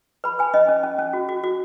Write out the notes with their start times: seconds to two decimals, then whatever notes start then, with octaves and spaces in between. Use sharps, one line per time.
0.24 B4 B5
0.39 B4 G#5
0.54 C#4 D#5
0.69 C#4
0.84 C#4
0.99 C#4
1.13 F#4
1.29 F#4
1.44 F#4